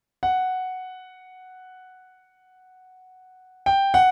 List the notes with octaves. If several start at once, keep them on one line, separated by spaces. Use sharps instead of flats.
F#5
G5
F#5